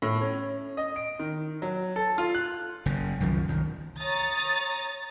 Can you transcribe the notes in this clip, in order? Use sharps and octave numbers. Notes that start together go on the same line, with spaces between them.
A2
C#4
D#5
D7
D#3
F#3
A4
F4
F#6
F#1 C#3
C2 F#2 D#3 F3
C2 D#3
C#5 A#5 D#6 A6